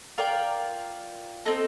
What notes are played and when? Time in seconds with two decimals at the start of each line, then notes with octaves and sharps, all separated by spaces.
0.18 F4 A#4 D5 G5
1.45 C4 D#4 A4